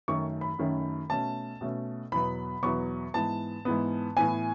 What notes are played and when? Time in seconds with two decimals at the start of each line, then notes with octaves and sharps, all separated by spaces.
0.08 F#2 D#3 A3 C#4 C#6
0.41 B5
0.58 F#2 D#3 A3 C#4
1.10 B2 A3 C#4 A5
1.61 B2 A3 C#4
2.12 E2 B2 F#3 B3 B5
2.63 E2 B2 F#3 B3 C#6
3.14 G#2 E3 B3 A5
3.65 G#2 E3 B3
4.17 A2 E3 B3 G#5